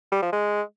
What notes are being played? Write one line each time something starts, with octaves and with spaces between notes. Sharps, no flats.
G3
F3
G#3